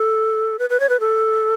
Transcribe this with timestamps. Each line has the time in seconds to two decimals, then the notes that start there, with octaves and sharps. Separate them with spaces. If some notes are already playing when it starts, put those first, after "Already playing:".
Already playing: A4
0.59 B4
0.70 B4
0.80 C#5
0.89 B4
1.00 A4